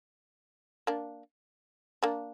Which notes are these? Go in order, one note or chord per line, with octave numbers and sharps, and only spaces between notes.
A#3 D4
A#3 D4